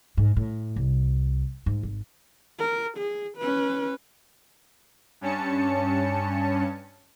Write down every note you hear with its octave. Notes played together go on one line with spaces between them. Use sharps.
G#2
A2
C2
G#2
G#1
A#4
G#4
C#4 B4
G2 C#4 A5 C#7